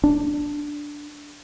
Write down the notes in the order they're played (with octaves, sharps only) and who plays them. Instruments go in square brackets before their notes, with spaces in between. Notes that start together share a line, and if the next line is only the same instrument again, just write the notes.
[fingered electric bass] D4